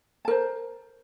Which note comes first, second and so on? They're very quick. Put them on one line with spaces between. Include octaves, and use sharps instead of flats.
A5 A#4 C5